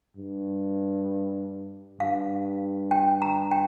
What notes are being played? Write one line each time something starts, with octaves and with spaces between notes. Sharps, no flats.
G2
G2 F5
G5
A#5
G5